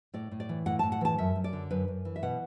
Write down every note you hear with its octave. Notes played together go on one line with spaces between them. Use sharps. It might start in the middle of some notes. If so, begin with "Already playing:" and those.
A2 D5
A2
D5
E3
A2 F#5
A2 A5
F#5
E3 A5
F#2 E5
F#2
D5
D3
F#2 B4
F#2
E3
E5
B2 F#5